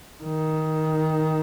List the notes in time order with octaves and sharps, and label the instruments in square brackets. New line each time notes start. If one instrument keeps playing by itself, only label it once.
[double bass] D#3